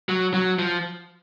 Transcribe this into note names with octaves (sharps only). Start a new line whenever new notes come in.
F#3
F#3
F3